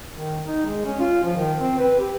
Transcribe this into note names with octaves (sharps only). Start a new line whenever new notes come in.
D#3
D#4
G#3
C#4
F4
F3
D#3
C4
B4
G4